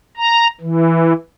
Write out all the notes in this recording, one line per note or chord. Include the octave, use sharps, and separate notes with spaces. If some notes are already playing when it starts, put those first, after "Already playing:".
A#5
E3